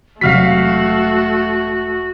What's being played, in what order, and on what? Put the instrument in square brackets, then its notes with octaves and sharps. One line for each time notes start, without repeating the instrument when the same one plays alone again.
[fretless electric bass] E1 C3 F#3 [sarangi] A3 [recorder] F#4 [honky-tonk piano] F5 F6 B6